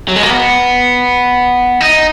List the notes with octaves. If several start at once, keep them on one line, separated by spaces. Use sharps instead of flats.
F#3
G#3
A#3
B3
D#4